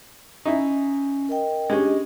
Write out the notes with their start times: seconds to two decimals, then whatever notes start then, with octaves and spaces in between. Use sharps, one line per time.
0.45 C#4 D#4 E4 G#5
1.29 A#4 D#5 G5
1.70 G#3 C#4 D4 G4 D#5